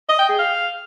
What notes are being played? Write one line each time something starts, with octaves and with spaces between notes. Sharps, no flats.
D#5
G5
G#4
F5